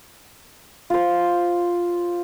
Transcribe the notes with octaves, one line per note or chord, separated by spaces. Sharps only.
F4 C5